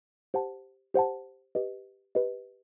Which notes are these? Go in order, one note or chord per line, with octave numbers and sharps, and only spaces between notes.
G4 C5 F#5 A5
G4 C5 F#5 A5
G4 B4 D#5
G4 B4 D#5